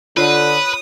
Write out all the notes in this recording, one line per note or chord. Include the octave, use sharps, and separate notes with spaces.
D3 F4 B4 C#5 D#6